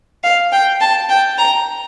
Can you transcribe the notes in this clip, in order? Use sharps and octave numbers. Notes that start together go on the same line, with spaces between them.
F5
G5
A5
G5
A#5